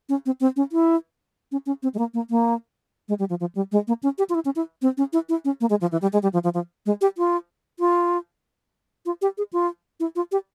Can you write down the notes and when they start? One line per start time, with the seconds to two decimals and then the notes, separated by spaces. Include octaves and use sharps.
0.09 C#4
0.26 C4
0.40 C4
0.56 C#4
0.72 E4
1.52 C#4
1.66 C#4
1.83 C4
1.94 G#3
1.99 A#3
2.14 A#3
2.30 A#3
3.09 G#3
3.19 G3
3.30 F3
3.40 F3
3.55 G3
3.72 G#3
3.88 A#3
4.03 C#4
4.18 G4
4.30 F4
4.35 E4
4.45 C#4
4.56 E4
4.82 C4
4.97 C#4
5.13 E4
5.29 E4
5.45 C#4
5.61 A#3
5.70 G#3
5.81 F3
5.92 E3
6.02 G3
6.13 G#3
6.23 G3
6.33 F3
6.44 F3
6.54 F3
6.86 G#3
7.01 G4
7.18 F4
7.80 F4
9.06 F4
9.22 G4
9.38 G#4
9.53 F4
10.00 E4
10.16 F4
10.32 G4